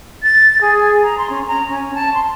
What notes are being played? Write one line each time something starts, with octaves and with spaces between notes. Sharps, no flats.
A6
G#4
A#5
C6
C#4
A#5
C#4
A5
C6